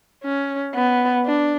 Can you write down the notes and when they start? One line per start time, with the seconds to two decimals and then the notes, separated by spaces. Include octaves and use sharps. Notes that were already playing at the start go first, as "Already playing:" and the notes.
0.24 C#4
0.75 B3
1.26 D4